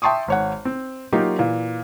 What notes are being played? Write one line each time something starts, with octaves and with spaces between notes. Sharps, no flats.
E5 G5 A5 C6 C#6 D#6
G#1 C#5 F#5
C4
F#3 A#3 D#4 F4 G4
A#2 E3